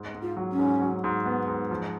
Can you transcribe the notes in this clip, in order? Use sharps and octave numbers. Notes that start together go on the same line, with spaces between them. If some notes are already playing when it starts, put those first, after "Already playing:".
Already playing: G#2
G#2
F4
F#3
C#4
G#2
F#3
G#2
B3
G#2
F3